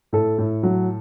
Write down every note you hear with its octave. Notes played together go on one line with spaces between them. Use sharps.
A2 A4
A2
F#3